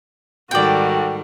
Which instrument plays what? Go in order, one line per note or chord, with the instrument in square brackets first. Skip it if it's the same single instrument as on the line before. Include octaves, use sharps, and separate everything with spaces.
[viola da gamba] G#2 D#3 G3 [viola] F#4 A4 [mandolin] D5 G5